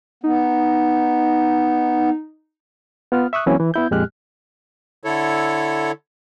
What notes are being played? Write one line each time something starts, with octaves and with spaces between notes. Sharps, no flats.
B3 D#4
B3 F4 F6
E5 C#6 D#6 F#6
E3 F#3 A#3 C4 C#4 E4
E3
B3 E4 G6
F2 A#2 G#3 G4 F6 F#6
D3 E4 A4 C#5